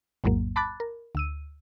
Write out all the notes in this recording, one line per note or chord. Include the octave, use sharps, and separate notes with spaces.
A1 E2 G#2 F#3 A#3
A5 B5 D6 F#6 A6
A#4
D2 E6 D#7